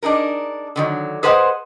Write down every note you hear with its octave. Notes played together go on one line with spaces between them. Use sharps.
D4 D#4 G#4 A#4
D3 D#3 F#3
G#4 B4 C5 D#5 F#5